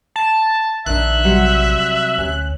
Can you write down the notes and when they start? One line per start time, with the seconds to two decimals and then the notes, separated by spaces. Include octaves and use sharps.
0.16 A5
0.86 A#1 D#3 D4 E5 F#6
1.24 C3 F#3 G3
2.18 D2 C#4